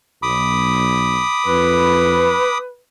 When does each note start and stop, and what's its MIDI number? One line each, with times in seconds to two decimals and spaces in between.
0.23 1.20 35
0.23 2.58 83
0.23 2.58 86
0.23 2.58 87
1.46 2.33 41
1.46 2.78 71